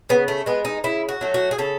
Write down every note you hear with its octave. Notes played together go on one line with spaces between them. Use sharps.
C#3 B3
A3
G#3 B3
D#4
C#3 E4
F#4
F#3 A3
F#4
G#4
C#3 A4